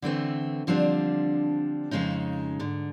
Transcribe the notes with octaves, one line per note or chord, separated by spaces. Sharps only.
D3 E3 A3 C4
D3 F3 G3 C4 D4
F2 C#3 G#3 C#4 D#4
G#2 D3